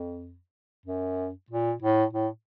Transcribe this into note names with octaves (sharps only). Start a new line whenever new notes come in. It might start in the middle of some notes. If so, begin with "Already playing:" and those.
Already playing: F2
F#2
A#2
A2
A2